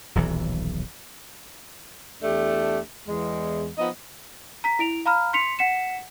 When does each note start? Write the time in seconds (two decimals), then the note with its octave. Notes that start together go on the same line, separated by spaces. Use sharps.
0.15 D#1 B1 E3 F#3
2.23 E2 A3 D4 G4
3.07 E2 G#3
3.78 F3 B3 D#4 D#5
4.64 A#5 B6
4.79 E4 D7 F7
5.06 F5 A#5 B5 F6
5.33 C6 B6 C#7 F7
5.59 F#5 B6 C#7 E7